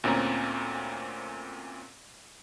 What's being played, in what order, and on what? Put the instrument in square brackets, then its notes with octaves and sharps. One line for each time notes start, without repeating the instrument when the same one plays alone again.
[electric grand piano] D2 A#2 C4 C#4 A#5